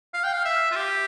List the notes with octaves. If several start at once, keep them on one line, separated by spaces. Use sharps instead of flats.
F5
G5
F5
E5
F4
G4